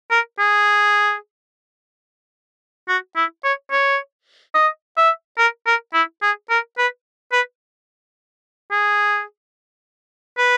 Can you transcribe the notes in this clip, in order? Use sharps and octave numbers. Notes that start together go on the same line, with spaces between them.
A#4
G#4
F#4
E4
C#5
C#5
D#5
E5
A#4
A#4
E4
G#4
A#4
B4
B4
G#4
B4